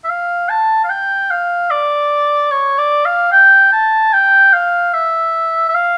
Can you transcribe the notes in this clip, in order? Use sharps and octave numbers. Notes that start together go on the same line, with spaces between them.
E5
F5
A5
F5
G5
F5
D5
C#5
D5
F5
G5
A5
G5
F5
E5
E5
F5